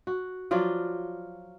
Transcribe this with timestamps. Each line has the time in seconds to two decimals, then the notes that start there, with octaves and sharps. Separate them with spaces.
0.07 F#4
0.51 F3 F#3 F4 D5